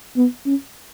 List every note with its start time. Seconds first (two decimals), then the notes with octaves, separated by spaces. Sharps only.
0.17 B3
0.46 C#4